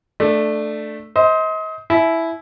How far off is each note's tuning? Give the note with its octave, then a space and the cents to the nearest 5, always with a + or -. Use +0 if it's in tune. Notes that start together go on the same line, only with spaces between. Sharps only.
A3 +0 D4 +15
C5 +0 D#5 +35
E4 +0 G#5 +45